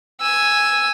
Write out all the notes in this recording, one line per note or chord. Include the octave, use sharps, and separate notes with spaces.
G#5 E6